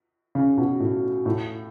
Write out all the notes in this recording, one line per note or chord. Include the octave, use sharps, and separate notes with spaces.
C#3
B2
A2
A2